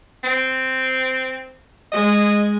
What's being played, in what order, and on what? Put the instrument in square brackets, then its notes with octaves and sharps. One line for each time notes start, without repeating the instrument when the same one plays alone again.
[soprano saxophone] C4
[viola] G#3 [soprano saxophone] D#5